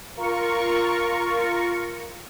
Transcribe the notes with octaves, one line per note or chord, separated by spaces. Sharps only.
F4 A#4 C#6